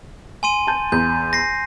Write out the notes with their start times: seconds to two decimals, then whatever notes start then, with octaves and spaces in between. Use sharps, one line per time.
0.43 G#5 C6 D#7
0.67 A5 G6
0.92 E2 G6
1.33 A#6 C7